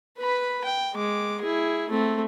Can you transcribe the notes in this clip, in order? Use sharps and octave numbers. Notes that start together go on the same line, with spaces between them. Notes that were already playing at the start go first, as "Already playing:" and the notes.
B4 B5
G5
G#3 D6
E4 G#4
A3 C4